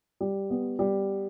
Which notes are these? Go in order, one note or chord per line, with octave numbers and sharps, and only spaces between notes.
G3
B3
G3